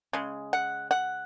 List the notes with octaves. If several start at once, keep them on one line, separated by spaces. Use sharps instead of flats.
C#3 G#3
F#5
F#5